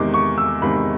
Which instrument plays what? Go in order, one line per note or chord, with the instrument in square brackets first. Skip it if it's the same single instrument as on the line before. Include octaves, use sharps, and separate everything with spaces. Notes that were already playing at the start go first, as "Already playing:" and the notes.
Already playing: [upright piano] E2 C3 D#3 G#3 D6
C#6
E6
E2 C3 D#3 G#3 B5